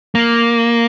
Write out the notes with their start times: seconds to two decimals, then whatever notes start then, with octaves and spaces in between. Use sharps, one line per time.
0.15 A#3